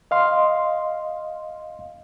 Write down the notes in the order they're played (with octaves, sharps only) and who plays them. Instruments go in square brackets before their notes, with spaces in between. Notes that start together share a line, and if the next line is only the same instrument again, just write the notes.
[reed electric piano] D#5 F5 C6